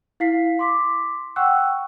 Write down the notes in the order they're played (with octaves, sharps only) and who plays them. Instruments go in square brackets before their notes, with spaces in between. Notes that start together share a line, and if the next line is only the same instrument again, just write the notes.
[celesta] E4 F5 B6 C7
C6 D6 B6
F#5 G5 C#6 E6 F#6